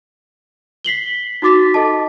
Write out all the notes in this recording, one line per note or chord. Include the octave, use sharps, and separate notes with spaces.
B6 C7 F#7 G7
D#4 F#4 D6 A6 B6
A4 D#5 A5